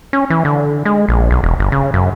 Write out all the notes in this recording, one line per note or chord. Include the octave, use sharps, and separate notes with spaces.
C#4
E3
D3
G#3
A#1
B1
E1
G1
C#3
F#2